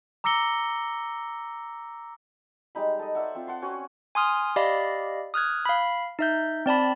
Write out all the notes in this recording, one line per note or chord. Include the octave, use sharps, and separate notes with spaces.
A#5 D6 E6 A#6 C#7 G7
G3 G#3 D#4 B5
A4 D#5
C5 D5 E5 F#5
C4 F4
F#5 A5 C6
C4 C#4 F#4 G#5
G#5 C6 D#6 F6
G4 D5 D#5 F5 B5
D#6 F6 F#6 G#6
F5 B5
D#4 E5 G6
C4 D5 A5 B5